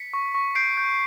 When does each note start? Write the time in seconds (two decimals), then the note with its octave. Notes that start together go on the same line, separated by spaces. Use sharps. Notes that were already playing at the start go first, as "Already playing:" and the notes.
Already playing: B6 C#7
0.14 C#6
0.35 C#6
0.55 G6 C7 D7
0.77 G6